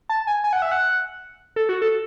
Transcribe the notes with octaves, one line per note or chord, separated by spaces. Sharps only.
A5
G#5
G#5
F#5
E5
F#5
A4
F#4
A4